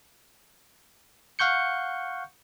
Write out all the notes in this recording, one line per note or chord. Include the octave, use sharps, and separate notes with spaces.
F5 F#5 C#6 G6 C#7